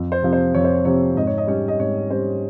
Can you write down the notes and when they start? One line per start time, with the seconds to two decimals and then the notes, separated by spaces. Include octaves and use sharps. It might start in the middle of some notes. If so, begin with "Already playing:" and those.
Already playing: F2
0.12 C5
0.22 C3 F3 C4
0.33 C5
0.54 F2 C#5
0.64 C5
0.74 C#5
0.85 C3 F3 C4 C#5
1.16 G#2 D#5
1.27 C#5
1.38 D#5
1.47 G3 C#4 C#5
1.68 D#5
1.79 G#2 C#5
2.10 G3 C#4 C5